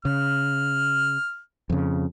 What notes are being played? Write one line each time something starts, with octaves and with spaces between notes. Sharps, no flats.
C#3 F6
F2 C#3